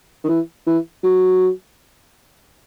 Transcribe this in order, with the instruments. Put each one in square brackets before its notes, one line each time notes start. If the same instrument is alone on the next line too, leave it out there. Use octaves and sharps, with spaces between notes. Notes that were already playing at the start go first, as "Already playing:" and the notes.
[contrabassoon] D#3
E3
E3
F#3